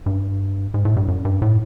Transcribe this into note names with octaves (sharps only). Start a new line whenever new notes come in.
G2
G#2
A2
G2
F#2
G2
A2